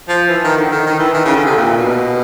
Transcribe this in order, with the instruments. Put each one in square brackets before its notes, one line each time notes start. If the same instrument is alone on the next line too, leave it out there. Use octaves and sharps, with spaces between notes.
[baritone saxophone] F3
E3
D#3
D3
D#3
D#3
E3
D#3
C#3
D3
C3
A#2
B2